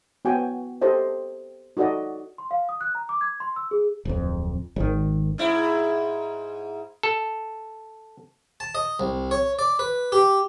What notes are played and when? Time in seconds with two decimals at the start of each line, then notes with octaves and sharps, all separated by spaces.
0.25 B3 F#4 G5 G#5
0.81 G4 A4 C5 D#5
1.77 D#4 F#4 A4 D5 D#5
2.38 C6
2.51 F5
2.69 D#6
2.81 F#6
2.95 A#5
3.09 D6
3.21 G#6
3.40 C6
3.56 E6
3.71 G#4
4.05 D1 F2
4.76 G#1 D#3
5.38 G#2 E4
7.03 A4
8.60 A5
8.75 D#5
9.00 C2
9.31 C#5
9.59 D5
9.79 B4
10.12 G4